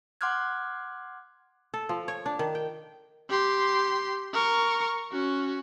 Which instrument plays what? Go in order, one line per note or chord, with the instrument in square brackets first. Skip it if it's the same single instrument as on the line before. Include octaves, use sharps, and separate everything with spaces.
[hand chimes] F#5 C6 D6 F6 F#6 G#6
[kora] A4
F3
C#5
D4
D#3
G5
[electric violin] G4 C6
A#4 C#6
C#4 F#4